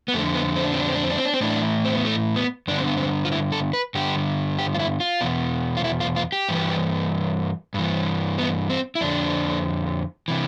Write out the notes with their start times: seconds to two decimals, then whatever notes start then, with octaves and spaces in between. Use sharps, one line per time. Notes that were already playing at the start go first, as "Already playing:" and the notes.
0.08 B3
0.14 F2 A3
0.18 D3
0.35 B3
0.56 C4
0.65 D4
0.72 C4
0.80 D4
0.87 C4
0.95 D4
1.03 C4
1.10 D4
1.17 C4
1.25 D4
1.34 C4
1.41 A2 E3 D4
1.84 C4
1.95 B3
2.05 A3
2.36 B3
2.68 G2 D3 D4
2.78 C4
2.88 B3
2.97 C4
3.25 F4
3.32 E4
3.52 A4
3.73 B4
3.95 G2 D3 G4
4.59 G4
4.74 F4
4.79 E4
5.00 F4
5.21 E2 B2
5.77 F4
5.84 E4
6.00 F4
6.16 F4
6.32 G4
6.49 G2 E3
7.74 G2 E3
8.38 B3
8.70 C4
8.95 E4
9.01 F2 D3 D4
10.28 C3 E3